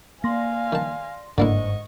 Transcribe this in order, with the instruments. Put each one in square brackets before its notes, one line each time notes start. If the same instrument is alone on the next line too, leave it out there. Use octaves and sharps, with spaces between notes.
[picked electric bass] A#3 [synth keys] D5 C6 A#6 [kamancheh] F5 G#5
[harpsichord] D#3 A5
[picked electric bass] D1 G1 [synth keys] G#2 [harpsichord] D3 A#3 E4 [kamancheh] D#5 C#6